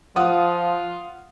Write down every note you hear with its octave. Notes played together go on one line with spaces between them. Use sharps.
F3 F4 F#5 D#6